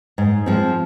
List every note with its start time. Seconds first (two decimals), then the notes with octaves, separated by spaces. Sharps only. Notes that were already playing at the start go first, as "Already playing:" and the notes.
0.18 G#2
0.46 F3 G#3 C4